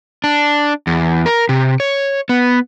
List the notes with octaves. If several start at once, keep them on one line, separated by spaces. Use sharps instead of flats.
D4
E2
A#4
C3
C#5
B3